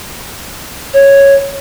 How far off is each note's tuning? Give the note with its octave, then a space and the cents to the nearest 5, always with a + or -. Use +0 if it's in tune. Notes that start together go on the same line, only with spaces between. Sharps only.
C#5 -5